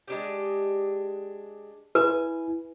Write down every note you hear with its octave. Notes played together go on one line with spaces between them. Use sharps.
G#3 D4 G4
E4 B4 G#5